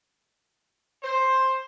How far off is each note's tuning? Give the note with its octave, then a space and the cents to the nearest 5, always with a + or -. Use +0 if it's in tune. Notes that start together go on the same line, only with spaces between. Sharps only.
C5 +10